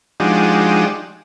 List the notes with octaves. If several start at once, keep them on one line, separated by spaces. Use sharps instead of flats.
F3 G#3 D4 D#4 F#4 G4